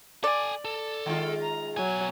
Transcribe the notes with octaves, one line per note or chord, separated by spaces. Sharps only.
A4 D5 G#5
A4
D#3 G#3 F4 G5
A#5
B2 F#3 G#5